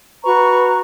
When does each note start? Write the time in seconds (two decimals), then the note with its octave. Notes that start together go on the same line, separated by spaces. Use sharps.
0.25 F#4 B4 A#5 C#6